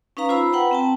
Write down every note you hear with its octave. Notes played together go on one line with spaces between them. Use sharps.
C#4 D#4 B4 F5 A#5
F4 C5 B5 E6
B4 F#5 G5 A#5 B5
C4 G5 A5